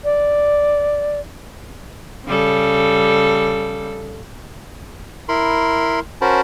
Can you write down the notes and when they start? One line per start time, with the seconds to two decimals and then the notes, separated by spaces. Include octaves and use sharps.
0.04 D5
2.26 C#3 G3 A4
5.29 E4 A#4 B5 C6
6.21 C#4 F#4 A#4 C5 A5 B5